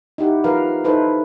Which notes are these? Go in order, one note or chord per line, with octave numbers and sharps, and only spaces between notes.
D#4 E4 G4 F#5
F3 A#4 B4 F5
D#4 E4 A4 B4 C5